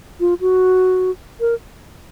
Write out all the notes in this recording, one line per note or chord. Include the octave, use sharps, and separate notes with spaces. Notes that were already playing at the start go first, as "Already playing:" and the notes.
F4
F#4
A#4